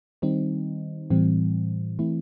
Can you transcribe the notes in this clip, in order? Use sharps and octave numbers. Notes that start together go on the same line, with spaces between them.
D#3 G3 C4 D#4
A2 E3 G3 C4
E3 A3 C4 E4